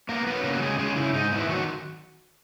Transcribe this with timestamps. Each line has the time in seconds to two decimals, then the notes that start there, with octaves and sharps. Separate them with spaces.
0.09 A#3 B3 A#4
0.27 F#3 B3 B4
0.44 C#3 A#3 A#4
0.53 F#4
0.61 C#3 G#3 G#4
0.79 C#3 G#3 G#4
0.96 C#3 E4
1.14 G#2 D#4
1.31 B3 E4
1.49 D#3 F#3 F#4